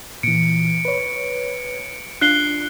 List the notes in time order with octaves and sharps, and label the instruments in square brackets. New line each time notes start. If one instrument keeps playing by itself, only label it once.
[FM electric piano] A#2 E3 [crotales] C#7 D7
[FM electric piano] B4 C#5
[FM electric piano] D4 F4 [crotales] F#6 C7 G7